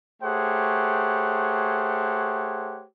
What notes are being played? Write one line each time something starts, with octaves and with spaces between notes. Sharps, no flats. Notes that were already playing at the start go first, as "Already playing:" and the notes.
A3 G4 G#4 C5 C#5 F#5